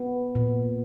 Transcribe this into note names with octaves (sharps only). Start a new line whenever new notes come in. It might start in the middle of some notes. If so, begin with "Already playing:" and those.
Already playing: B3
A#2